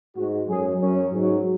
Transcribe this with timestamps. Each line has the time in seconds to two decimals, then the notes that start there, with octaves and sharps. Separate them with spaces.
0.16 G#2 G#3 F#4
0.48 F#2 F#3 G#4
0.80 F#2 F#3 C#4
1.11 G#2 F#3